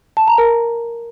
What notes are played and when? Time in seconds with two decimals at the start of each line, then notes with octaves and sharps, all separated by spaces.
0.17 A5
0.28 A#5
0.38 A#4